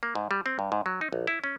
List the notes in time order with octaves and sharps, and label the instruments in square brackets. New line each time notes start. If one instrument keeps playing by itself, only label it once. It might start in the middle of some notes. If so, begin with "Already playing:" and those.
[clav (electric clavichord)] A#3
G#2
G3
C4
G2
G#2
F#3
D#4
A#1
E4
C#4